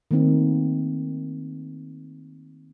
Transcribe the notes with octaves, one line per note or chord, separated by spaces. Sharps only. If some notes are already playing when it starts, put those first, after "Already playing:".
D#3 A3 A#3 C4 D#4